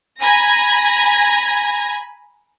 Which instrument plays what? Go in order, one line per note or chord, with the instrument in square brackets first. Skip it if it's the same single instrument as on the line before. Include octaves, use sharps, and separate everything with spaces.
[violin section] G#5 A#5 B5 G#6 A#6